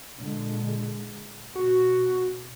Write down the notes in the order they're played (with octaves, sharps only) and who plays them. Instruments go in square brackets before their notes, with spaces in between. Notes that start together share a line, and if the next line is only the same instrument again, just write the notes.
[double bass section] A#2 D3 G#3
[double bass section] B2 [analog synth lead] F#4